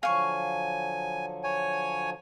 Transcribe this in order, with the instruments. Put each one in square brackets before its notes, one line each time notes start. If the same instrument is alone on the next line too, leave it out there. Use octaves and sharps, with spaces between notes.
[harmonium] D3 F3 F#3 [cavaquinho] F5 C#6 [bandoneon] G#5
[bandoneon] C#5 G#5